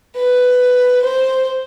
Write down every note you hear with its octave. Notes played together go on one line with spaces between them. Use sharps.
B4
C5